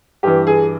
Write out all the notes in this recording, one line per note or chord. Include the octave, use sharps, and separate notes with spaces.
G2 E3 G4
G#4